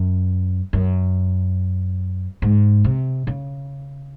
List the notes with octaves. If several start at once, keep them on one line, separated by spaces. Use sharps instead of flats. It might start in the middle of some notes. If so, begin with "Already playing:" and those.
Already playing: F#2
F#2
G#2
C3
C#3